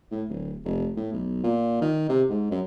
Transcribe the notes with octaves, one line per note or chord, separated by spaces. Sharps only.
A2
D1
F1
A2
B1
A#2
D#3
C3
G#2
F#2